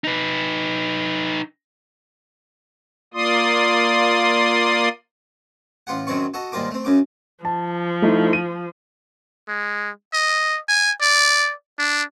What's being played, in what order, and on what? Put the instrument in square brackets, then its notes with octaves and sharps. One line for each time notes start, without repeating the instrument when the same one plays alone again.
[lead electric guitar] D#4 B4
[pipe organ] A#3 F4 D5 C6 D#6
[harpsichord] A1 F4 G4 F#5
F#2 D#3 F#3 C4 D5 C#6
F#4 A4 D#5
D#2 G#2 G3 F4 A#4 D6
A3 C4
F#2 C#3 D6
[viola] F3 [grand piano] A5
[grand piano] A3 D#4 E4
D#7
[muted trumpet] G#3
D#5
G#5
D5
D4